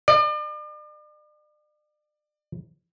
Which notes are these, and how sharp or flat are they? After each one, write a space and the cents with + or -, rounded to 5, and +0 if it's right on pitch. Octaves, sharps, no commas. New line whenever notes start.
D5 +40